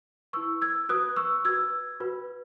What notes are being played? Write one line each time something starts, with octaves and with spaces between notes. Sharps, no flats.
E4 B4 C#6 E6
E6 G#6
F#4 B4 D#6 F#6
C#6 E6
F#4 B4 E6 G#6
F#4 B4